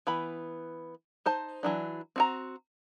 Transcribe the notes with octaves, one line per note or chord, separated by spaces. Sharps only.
E3 B3 B5
D#4 C5 A5
E3 F#3 D4
C4 F#4 A#5